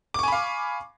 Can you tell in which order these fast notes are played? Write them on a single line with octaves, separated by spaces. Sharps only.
D6 C#6 G#5 B5 F5